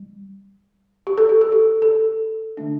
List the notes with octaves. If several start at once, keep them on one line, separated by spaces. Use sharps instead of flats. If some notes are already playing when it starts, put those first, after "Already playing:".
Already playing: G3
G4
A4
G4
A4
G4
A4
D3 A3 D4